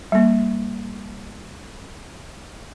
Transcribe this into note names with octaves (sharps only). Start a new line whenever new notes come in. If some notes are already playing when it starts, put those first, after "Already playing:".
G3 A#3